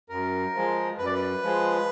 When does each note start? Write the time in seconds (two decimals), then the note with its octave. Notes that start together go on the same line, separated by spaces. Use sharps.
0.09 F#2 A#4
0.54 F3 G#3
0.98 F#2 B4
1.06 D5
1.14 B4
1.42 F3 G#3